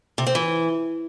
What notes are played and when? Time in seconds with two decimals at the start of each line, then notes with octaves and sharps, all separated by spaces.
0.18 C3
0.27 C4
0.35 E3